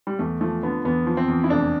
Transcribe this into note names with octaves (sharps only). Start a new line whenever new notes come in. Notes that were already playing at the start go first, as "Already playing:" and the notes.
G3
E2 A3
F3 A3
D3 B3
E2 B3
F3
C4
E2
E4
F1 D4